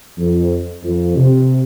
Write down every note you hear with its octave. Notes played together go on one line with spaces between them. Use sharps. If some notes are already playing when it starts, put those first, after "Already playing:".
F2
F2
C3